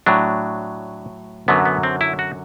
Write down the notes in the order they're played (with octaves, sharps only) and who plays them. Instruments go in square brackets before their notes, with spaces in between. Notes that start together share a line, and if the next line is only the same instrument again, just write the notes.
[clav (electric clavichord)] A2 F#3 D4
F#2 D3 F#3 B3
B3
C4
E4
F#4